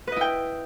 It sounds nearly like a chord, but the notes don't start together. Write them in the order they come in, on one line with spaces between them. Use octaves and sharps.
B4 D#5 E4 G5